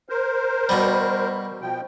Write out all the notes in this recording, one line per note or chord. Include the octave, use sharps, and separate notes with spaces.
A#4 C5
B2 G3
B2 F3 G5